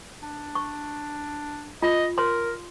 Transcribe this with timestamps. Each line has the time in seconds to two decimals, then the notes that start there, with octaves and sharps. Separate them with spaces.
0.22 D4
0.55 C#6
1.82 F4 D#5
2.18 A#4 C#5 C6